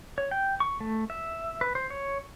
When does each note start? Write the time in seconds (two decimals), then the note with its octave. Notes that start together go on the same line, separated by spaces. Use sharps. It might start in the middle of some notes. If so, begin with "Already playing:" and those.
0.18 C#5
0.31 G5
0.60 C#6
0.81 A3
1.10 E5
1.61 B4
1.75 C5
1.90 C#5